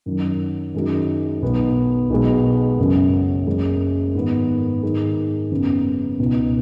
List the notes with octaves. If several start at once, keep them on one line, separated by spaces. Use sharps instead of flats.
F#2 D#3 F#3
F#2 D#3 G#3 D#4 F#4
B1 B2 B3
B1 B2 G#3 B3
F#1 F#2 C#3 F#3
F#1 F#2 C#3 G#3
G#2 D#3 B3
G#2 D#3 G#3
F#1 F#2 C#3 B3
C#2 B2 B3 D#4